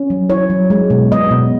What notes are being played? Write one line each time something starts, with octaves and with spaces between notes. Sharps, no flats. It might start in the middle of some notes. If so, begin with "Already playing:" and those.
Already playing: C#4
F#3
E4 C#5
F#3
G#3
B2
B3 D#5
B2